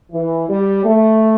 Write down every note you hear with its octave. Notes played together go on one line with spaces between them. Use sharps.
E3
G3
A3